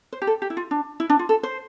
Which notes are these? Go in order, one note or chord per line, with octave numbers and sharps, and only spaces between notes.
C5
G4
A4
G4
E4
F4
D4
E4
D4
F4
A4
C5